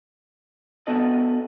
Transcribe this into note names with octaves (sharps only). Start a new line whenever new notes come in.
B3 D4 F#4 A4 D#5